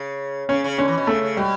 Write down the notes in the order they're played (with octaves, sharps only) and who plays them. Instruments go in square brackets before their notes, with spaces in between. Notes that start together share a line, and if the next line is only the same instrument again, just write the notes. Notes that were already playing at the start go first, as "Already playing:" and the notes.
Already playing: [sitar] C#3
[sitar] C#3 [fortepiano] C#4
[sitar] C#3
[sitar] D3 [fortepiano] C#4
[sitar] E3
B2
[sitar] C#3 [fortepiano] A3
[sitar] C#3
[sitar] B2 [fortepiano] G3